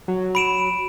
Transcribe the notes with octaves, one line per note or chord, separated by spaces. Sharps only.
F#3
B5 D7 E7